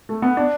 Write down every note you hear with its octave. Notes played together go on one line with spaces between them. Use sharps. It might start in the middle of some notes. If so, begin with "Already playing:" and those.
A3
B3
D4